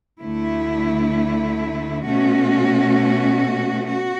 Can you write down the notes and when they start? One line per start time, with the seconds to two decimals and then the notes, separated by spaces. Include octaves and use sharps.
0.22 D2 D3 A3 E4
2.06 B2 A3 C#4 F#4
3.89 F#4